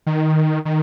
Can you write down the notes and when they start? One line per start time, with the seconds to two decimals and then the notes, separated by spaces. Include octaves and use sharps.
0.06 D#3
0.65 D#3